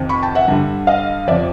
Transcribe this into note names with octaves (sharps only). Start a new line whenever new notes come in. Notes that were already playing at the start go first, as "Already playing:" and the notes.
Already playing: F2 C3 D#3
B5 C#6
G5 A5
E5 F#5
G2 D3 G3
D#5 F5
F2 C3 F3 D5 E5